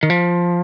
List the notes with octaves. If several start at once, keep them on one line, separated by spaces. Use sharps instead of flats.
D#3
F3